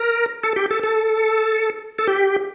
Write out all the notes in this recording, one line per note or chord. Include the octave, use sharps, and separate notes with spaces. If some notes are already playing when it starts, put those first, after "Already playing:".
Already playing: A#4
A4
G4
A4
A4
A4
G4